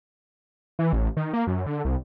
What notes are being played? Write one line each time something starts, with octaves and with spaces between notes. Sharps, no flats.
E3
A1
D#3
A#3
F#2
D3
C2